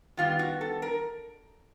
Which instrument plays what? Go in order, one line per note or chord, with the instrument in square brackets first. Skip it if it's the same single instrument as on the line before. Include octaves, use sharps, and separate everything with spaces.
[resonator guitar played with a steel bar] D#3 G3 B3 F4
F#4
A4
A#4